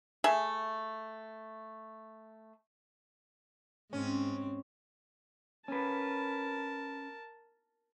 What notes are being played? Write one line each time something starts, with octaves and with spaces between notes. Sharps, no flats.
A3 G#4 E5
G#2 C4 C#4
C#4 A#4 B4 A5